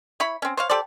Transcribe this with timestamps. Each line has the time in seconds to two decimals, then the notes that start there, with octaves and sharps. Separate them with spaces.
0.20 E4 C#5 B5
0.42 C4 C#4
0.57 C5 C#5 F5
0.70 G4 A4 C5 D5